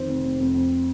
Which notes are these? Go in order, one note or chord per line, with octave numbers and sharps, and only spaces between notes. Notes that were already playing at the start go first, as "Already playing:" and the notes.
Already playing: F2 D#3 C5
F1
F1
F2
F2